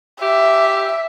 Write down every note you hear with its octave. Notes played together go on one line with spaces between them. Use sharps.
G4 E5